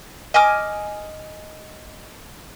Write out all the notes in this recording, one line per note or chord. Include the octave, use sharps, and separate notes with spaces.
D#5 G#5 D6 F6